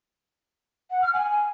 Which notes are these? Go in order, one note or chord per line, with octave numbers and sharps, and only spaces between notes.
F#5
F6
G#5